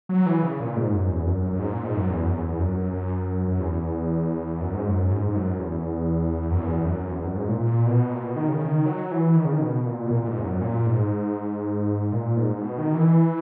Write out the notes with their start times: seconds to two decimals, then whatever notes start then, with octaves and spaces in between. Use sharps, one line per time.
0.09 F#3
0.26 E3
0.43 C#3
0.60 A#2
0.77 G#2
0.93 F#2
1.10 E2
1.26 F#2
1.42 F#2
1.52 F#2
1.59 G#2
1.72 A#2
1.85 G#2
1.97 F#2
2.10 E2
2.26 F#2
2.35 E2
2.59 F#2
2.76 F#2
2.93 F#2
3.48 F#2
3.60 E2
4.60 F#2
4.74 G#2
4.88 F#2
5.11 G#2
5.28 G#2
5.36 F#2
5.60 E2
6.51 F#2
6.60 E2
6.85 F#2
7.11 E2
7.23 F#2
7.36 G#2
7.48 A#2
7.60 A#2
7.86 B2
8.11 A#2
8.23 B2
8.36 D#3
8.48 C#3
8.62 D#3
8.86 F#3
9.11 E3
9.35 D#3
9.45 C#3
9.53 D#3
9.62 B2
9.86 A#2
10.06 B2
10.11 A#2
10.23 A#2
10.28 G#2
10.39 E2
10.44 F#2
10.61 A#2
10.86 G#2
12.12 A#2
12.37 G#2
12.62 B2
12.78 D#3
12.95 E3